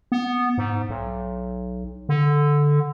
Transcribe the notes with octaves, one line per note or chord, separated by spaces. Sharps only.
B3
G#2
B1
D3